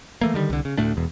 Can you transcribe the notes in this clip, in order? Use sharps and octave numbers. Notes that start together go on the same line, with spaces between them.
E3 A3 A#3
D3 D#3 G3
C2 D3
C#3
D2 A2 A3 D4
E1 E2